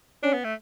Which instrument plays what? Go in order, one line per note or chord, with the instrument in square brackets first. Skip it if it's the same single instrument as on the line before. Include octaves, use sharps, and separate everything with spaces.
[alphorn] C#4 [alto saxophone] D4
[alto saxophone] B3
A3